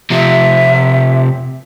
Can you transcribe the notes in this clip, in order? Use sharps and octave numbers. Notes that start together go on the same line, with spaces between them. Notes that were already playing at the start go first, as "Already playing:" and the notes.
C3 F3 E5